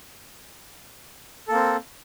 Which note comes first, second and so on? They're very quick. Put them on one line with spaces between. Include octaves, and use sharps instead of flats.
A4 A#3 C4